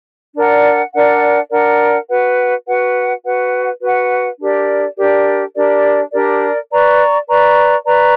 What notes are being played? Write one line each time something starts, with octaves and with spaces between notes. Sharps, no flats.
D4 A#4 D5 F#5
D4 A#4 D5 F#5
D4 A#4 D5 F#5
F#4 B4 F#5
F#4 B4 F#5
F#4 B4 F#5
F#4 B4 F#5
D4 G4 A#4 D5
D4 G4 A#4 D5
D4 G4 A#4 D5
D4 G4 A#4 D5
B4 D5 A#5 C#6
B4 D5 A#5 C#6
B4 D5 A#5 C#6